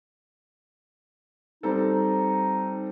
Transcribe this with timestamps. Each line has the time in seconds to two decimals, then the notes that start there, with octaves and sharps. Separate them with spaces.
1.63 G3 C4 D#4 A4